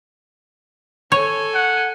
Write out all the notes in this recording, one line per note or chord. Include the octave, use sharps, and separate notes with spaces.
A4 C#5 G#5
F#5